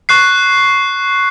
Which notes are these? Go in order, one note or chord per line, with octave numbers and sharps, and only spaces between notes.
C#6 F#6 C7